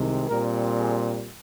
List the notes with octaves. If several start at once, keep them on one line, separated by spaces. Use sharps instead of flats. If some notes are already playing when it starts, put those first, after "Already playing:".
Already playing: C2 C3 D#3 G#3
A#2 G3 C4 A#4
G#4